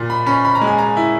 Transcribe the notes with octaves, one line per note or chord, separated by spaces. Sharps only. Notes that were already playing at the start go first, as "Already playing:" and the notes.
Already playing: A#2
B5
C#4 B5
B5
A#5
G#3
G#5
A#5
E4